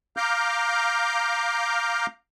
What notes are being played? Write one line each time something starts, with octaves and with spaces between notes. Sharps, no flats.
F5 A#5 D6 F6 G6